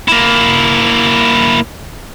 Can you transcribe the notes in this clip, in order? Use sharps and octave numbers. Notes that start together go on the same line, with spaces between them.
A#3 E4